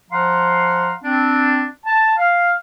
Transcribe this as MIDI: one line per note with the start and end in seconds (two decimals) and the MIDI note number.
0.10 0.93 53
0.10 0.93 77
0.10 0.93 78
0.10 0.93 82
0.10 0.93 84
1.03 1.66 60
1.03 1.66 62
1.85 2.12 81
2.17 2.52 77